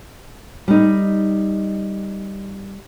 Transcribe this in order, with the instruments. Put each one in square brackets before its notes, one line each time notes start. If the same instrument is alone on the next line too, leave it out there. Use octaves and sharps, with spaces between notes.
[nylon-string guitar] G3 D#4